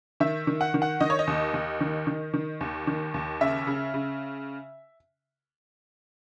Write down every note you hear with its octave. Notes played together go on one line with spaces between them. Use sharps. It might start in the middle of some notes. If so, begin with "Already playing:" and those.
D#3 E5
D#3
F#5
D#3
F#5
D#3 D#5
C#5
D#5
D#2
D#2
D#3
D#3
D#3
D#2
D#3
D#2
C#3 E5
C#3
C#3